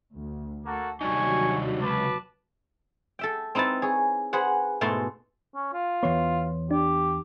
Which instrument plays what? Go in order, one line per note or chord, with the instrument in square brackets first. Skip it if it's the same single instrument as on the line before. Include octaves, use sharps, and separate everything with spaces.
[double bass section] D2
[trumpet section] A#3 F#4 A4
[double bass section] D#2 C3 F#3 [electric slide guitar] G3 D4 D#4 [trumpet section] G#5 C#6
[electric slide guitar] C#3 G#3 [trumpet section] B4 A5 D6
[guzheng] A4 E5 G5
C4 D#4 E4 B4 A5
G#4 C#5
G#4 B4 C5 F#5
G#2 B2 A3 E4 A5 C6
[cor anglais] C#4
F4
[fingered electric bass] E2 E3 B3 [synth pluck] B4 C#5 C6
[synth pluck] D4 [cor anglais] G4